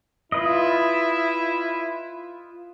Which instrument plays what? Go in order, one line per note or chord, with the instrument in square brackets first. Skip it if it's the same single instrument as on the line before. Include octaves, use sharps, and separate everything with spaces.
[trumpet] E4 [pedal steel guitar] F4 B4 D#5